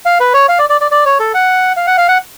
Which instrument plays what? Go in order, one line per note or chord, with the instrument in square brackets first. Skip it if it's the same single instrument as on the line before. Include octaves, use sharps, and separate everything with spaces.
[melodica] F5
B4
C#5
F5
D5
D5
D5
D5
C#5
A4
F#5
F5
F#5
F5
F#5